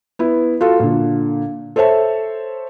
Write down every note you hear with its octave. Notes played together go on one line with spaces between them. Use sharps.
B3 E4
F4 F#4 A4
A#2 D3
A4 C5 C#5 E5 A5